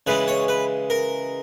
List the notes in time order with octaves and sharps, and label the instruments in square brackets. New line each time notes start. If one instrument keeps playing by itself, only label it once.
[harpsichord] C#3 E3 G#3 B4
C#5
B4
A#4